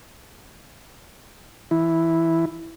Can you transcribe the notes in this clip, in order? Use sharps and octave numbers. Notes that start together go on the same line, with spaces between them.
E3 E4